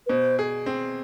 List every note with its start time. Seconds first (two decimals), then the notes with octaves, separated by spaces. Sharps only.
0.06 B4
0.09 B2 C5
0.39 G#4
0.66 C4